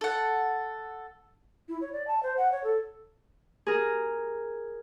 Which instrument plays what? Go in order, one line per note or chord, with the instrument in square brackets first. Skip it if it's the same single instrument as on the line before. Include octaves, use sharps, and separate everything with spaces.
[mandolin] A4 F#5
[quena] E4
C#5
D5
A5
C5
F#5
C#5
A4
[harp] G#4 A#4